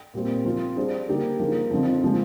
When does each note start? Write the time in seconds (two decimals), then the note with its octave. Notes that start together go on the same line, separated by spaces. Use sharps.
0.14 A#2 G3 C4
0.45 F3 C4 F4
0.76 G3 D4 G#4 C5
1.08 D3 G3 A#3 D#4 G4
1.39 F3 A#3 D#4 G#4
1.71 F2 D3 F3
2.04 F3 G#3